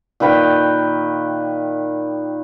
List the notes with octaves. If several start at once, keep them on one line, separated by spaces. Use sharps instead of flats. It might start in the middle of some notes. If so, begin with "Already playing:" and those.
A#2 D#3 B4 G5